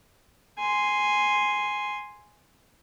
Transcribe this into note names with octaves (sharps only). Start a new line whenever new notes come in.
G#5 C6